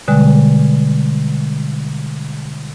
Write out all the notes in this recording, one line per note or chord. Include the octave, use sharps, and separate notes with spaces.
B2 D3 G3 G#3